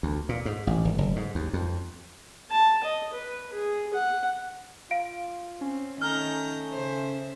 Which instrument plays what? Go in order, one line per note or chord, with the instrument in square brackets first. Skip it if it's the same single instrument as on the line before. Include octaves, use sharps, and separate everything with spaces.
[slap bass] D2
A#2
G#2
A1
G#1
F#1
G#2
D#2
F2
[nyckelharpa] A5
D#5
B4
G#4
F#5
[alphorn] F4 [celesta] F5 D7
[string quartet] C4 [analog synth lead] C#4
[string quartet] D#3 A#5 G6 [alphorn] A3 [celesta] F6
[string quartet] C#3 C5 E5